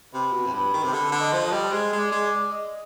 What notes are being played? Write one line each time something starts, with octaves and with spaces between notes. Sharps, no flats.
C3 B4
B2
F2
G2 B4
D#3
C3
D3 B4
D3
D#5
F3
D#5
G3
G#3 D#5
G#3
D5
G#3
D5
D#5